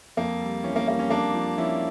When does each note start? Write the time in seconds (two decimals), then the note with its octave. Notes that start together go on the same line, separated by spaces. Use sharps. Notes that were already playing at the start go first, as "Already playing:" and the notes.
0.17 F2 A#3
0.41 G3
0.64 E3 C#4
0.76 A#3
0.87 G3 A#3
0.99 C#4
1.10 F2 A#3 D4
1.34 F3
1.57 F3 C#4 E4